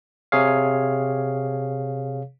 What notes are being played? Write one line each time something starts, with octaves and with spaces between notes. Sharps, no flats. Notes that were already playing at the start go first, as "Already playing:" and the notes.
C3 G#4 C#5 F5